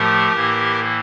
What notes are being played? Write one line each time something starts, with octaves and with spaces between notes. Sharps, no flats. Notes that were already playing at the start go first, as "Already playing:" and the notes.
Already playing: A2 F3 A3 G4 A#4
A2 E3 A#3